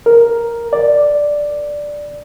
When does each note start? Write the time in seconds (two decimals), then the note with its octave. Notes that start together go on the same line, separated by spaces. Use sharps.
0.06 A#4
0.73 D5